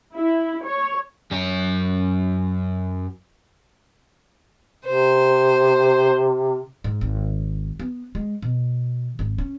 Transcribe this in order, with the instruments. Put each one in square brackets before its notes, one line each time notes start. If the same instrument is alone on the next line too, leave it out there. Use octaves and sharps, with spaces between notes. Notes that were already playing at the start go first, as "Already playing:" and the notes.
[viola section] E4
C#5
[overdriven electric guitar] F#2 C#5
[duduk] C3 [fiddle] C5
[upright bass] G#2
G#1
B3
G#3
B2
G#1
C#4